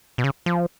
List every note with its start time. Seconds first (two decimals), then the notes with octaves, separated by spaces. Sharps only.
0.18 B2
0.24 C#3
0.46 F3